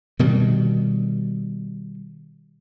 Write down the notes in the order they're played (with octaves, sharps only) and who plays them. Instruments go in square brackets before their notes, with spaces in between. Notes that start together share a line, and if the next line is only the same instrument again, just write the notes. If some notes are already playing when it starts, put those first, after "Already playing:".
[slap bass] B2 D#3 G3